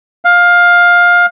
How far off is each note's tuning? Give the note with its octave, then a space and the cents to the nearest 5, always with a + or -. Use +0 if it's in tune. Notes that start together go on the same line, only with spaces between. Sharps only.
F5 +15